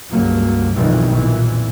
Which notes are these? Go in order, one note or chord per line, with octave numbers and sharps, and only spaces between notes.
C#2 G2 F#3 A#3
B1 F2 G#2 D#3 E3 G3
F2 A#2 E3